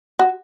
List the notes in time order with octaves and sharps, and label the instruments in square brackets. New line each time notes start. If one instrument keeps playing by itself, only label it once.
[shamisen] F#4